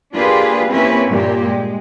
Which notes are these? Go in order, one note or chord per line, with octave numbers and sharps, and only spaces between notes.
A#3 D4 F4 G4 G#4 B4
A#3 C4 C#4 E4 G4 B4
G2 A#2 G4
G#3